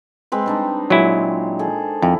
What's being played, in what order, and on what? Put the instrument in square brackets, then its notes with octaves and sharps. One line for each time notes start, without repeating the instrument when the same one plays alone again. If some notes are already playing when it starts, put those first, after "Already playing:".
[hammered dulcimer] G#3 C4 B4
G3 D4 D#4
[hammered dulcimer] A#2 G#3 [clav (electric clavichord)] F#3 E4
[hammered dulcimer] G#4 A4
[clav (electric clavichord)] F2 [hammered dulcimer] E4